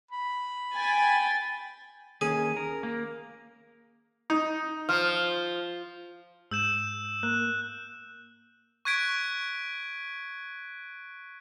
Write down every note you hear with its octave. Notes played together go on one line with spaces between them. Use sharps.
B5
G5 G#5 A6
D#2 C#4 G#4
A#4
A#3
D#4
F3 F6
G#2 E6 G6 E7
A#3 F#6
C#6 F#6 G#6 B6 D7